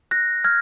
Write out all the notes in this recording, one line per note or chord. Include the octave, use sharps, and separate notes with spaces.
F#6 A#6
F6 G#6